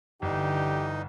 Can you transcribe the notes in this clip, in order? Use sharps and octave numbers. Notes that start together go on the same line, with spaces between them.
G1 D3 E3 D#4 G4